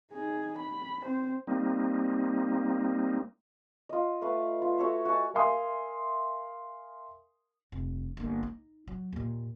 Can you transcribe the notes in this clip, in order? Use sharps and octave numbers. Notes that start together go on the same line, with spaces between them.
D#4 G#4
B5
C4 C5
G3 A#3 C4 D#4
F4 D#5
A3 B4 F5
F4
F#4 A4 C#5 E5
F#4 D#5 G#5 A5
A#4 E5 F5 G#5 C6 D#6
F1 G2
G1 A#3
D#4
F#3
D#2 A#2